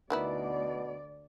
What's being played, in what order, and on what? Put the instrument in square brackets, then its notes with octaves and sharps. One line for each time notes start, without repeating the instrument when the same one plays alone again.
[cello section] D2 D5 [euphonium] B2 [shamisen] D#3 B3 E4